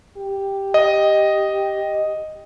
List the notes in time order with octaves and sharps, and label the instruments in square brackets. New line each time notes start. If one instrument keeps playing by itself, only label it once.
[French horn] G4
[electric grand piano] D#5